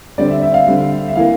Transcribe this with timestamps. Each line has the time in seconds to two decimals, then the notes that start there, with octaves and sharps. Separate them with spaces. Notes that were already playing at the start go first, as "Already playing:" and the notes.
0.18 D3 G3 C4 D5
0.30 E5
0.42 E5
0.54 F5
0.67 D3 G3 C4
1.08 E5
1.15 E3 A#3 F5